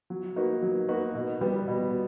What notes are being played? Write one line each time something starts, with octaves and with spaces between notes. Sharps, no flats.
F#3
A#3 D#4 F#4 B4
F#3
A#3 D#4 F#4 B4
B2
G3 B3
B2